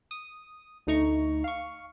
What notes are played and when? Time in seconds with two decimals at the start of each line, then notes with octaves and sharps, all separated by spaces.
0.11 D#6
0.87 D2 A3 D#4 A#5 C#6
1.44 F5 C#6